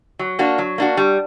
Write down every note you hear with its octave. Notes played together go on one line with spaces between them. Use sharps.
F#3
A#3 D4 F#4
F#3
A#3 D4 F#4
G3